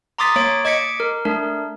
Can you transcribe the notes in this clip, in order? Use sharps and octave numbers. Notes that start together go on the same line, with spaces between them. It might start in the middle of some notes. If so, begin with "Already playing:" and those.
A#5 C6 D6 D#6 A6 B6
A#3 C#5 D7
D#5 D6 G#6 B6 C#7 D7
A#4
A3 D4 A#4